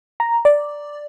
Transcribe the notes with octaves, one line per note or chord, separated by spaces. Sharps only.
A#5
D5